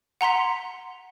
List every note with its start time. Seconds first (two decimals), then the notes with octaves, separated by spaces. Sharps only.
0.21 F#5 A#5 C6 B6